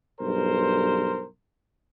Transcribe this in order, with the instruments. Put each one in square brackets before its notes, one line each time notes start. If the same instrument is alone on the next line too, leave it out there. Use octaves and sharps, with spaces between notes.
[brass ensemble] B1 G2 A#4 C5